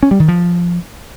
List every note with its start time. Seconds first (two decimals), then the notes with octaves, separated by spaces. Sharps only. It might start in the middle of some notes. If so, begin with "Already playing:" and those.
0.03 C#4
0.11 G3
0.20 D#3
0.28 F3